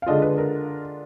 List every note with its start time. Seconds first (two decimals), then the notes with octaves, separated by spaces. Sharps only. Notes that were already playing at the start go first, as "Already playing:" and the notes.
0.02 F5
0.06 D3 G#3 D4 F4 D#5
0.22 B4
0.38 A#4